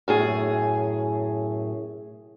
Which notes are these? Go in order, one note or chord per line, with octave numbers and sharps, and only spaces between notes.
F#2 A2 G#4